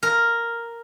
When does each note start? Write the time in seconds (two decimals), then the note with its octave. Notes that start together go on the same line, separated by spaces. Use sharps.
0.03 A#4